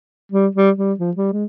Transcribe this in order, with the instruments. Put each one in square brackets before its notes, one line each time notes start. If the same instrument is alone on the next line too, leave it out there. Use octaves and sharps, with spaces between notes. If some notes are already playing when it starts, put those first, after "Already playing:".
[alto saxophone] G3
G3
G3
F3
G3
G#3